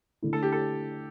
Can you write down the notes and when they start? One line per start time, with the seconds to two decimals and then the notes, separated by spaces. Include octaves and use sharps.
0.22 D3 A3 E4
0.33 A4
0.43 G4
0.52 A4